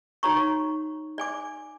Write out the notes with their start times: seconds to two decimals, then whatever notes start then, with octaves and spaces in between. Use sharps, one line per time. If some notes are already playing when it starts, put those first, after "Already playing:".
0.23 D#4 F#4 C#5 A#5 C#6
1.18 D5 G#5 D6